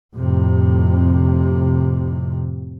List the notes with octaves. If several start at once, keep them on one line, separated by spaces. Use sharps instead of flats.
F2 A2 C3